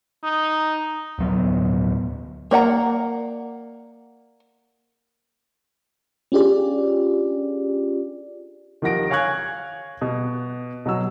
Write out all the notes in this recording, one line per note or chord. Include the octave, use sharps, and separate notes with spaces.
D#4
D1 F#3 B3
A#3 D5 F#5 A#5
C#4 D4 F4 G4 G#4 D5
D#3 F3 G4 F#5 A#6 D7
C#5 F5 G#5 C#6 F#6 G#6
B2
B2 F#3 F#4 E6